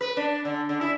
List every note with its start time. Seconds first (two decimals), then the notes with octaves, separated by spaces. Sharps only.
0.01 B4
0.17 D4
0.45 D3
0.69 D3
0.81 E4